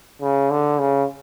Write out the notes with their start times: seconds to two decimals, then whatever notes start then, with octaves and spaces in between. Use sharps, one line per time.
0.22 C#3
0.50 D3
0.79 C#3